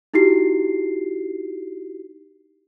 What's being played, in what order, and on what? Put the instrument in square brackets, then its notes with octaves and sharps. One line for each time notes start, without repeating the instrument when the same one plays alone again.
[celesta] D#4 E4 F#4 G4 C7